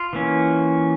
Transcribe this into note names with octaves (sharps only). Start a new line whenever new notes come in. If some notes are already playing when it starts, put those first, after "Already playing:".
Already playing: F4
E3 A#3 C#4